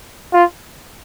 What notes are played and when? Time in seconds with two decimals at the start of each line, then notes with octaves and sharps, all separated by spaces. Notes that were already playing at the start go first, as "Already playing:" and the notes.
0.33 F4